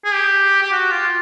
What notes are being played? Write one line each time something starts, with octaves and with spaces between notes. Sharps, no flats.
G#4
G4
G4
F#4
F4